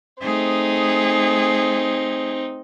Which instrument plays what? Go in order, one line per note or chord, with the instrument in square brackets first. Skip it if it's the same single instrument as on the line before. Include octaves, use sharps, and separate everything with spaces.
[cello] A3 G#4 [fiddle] C4 D#4